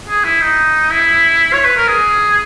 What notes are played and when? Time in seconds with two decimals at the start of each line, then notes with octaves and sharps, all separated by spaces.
0.08 G#4
0.24 E4
0.41 D#4
0.91 E4
1.53 C#5
1.65 B4
1.77 A#4
1.88 G#4